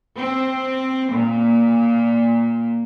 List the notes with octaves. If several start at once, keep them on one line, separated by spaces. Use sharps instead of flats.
C4
A#2